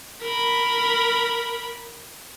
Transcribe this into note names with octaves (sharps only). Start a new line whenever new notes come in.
A#4 B5